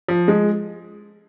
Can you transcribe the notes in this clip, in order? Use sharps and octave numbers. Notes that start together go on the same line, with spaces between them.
F3
G#3